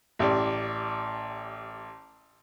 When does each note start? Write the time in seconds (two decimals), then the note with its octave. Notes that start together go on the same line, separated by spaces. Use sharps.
0.19 A1 G4 D5